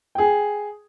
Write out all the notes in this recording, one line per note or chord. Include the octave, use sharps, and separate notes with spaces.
G#4 G5